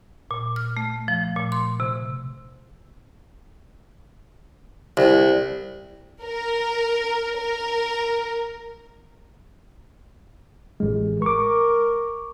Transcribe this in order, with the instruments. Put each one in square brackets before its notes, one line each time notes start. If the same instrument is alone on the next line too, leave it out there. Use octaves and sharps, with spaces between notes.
[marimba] A#2
F6
A3
F3
A#2
C6
C3
[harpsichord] C2
[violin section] A#4
A#4
[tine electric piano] A1 G#3
[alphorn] A#4 [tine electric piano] C#6 D6